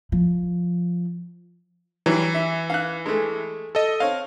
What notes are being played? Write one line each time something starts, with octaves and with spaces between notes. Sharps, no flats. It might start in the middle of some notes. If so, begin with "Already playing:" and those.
F3
E3 F#3 G3
E5
F5 F#6
G#3 A3
A4 D#5
C4 C#5 F5